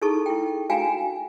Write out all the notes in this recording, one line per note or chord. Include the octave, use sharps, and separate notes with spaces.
D#4 E4 G#4 A4 A5 C#6
E4 G5
D4 F#4 F5 G5 G#5 A#5